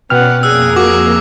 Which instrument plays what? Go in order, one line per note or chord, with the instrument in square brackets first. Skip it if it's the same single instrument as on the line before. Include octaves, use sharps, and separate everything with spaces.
[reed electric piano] B2 G5 F6 [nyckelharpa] B3 F#5 [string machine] C#4 D5
[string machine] F2 A#3 A#4 [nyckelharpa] G#4 [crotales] E6 F#6
[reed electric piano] F#4 [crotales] D6